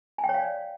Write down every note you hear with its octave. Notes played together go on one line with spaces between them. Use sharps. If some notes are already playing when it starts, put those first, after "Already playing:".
G#5
G5
C#5
F5
D5